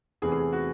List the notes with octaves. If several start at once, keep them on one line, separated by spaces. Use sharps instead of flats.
E2 C3 E3 A3 G#4
G#4
F#4